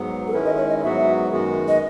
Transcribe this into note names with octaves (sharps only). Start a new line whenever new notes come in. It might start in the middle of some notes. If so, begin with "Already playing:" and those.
Already playing: G#2 F#3 B3
A4
D#3 G#3 C#4 E4 B4
D#5
C#5
D#5
G#2 F#3 B3 F#4 E5
F#2 D#3 G#3 B3 F#4
D#5